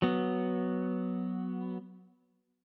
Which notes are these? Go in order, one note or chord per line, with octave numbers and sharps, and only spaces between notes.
F#3 B3